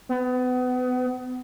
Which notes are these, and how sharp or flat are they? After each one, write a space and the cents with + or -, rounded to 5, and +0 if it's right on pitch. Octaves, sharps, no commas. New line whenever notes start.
B3 +30